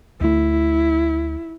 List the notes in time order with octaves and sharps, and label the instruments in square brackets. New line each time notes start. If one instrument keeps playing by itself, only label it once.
[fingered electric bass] D2 A3 [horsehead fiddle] E4